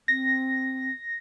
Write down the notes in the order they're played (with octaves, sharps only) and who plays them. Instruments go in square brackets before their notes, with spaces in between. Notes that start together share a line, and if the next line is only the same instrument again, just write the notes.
[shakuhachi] C4 [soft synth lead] A#6